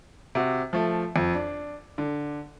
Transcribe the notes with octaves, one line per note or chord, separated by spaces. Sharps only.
C3 F#4
F3 A3
F2
D4
D3